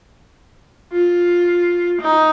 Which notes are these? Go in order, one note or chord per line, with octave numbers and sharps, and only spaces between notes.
F4
D#4